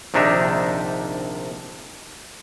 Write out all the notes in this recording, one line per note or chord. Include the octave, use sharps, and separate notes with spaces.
A#1 C3 D#3 D4 D#4 E5